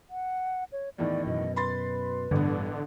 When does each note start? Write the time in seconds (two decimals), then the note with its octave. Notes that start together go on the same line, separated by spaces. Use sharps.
0.10 F#5
0.72 C#5
0.98 E2 A2 D#3 D5
1.27 F#2 B2 D#5
1.56 B4 B5 C6 A6
2.31 A1 G2 D3 B3